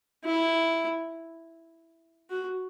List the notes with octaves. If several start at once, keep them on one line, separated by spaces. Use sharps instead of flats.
E4
F#4